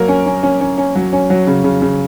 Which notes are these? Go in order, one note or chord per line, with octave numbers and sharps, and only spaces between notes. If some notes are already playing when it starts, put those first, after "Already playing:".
Already playing: F#3 A#3 A#4
C#4
C#4
C#4
C#4
C#4
F#3
C#4
F#3
C#3
C#3
C#3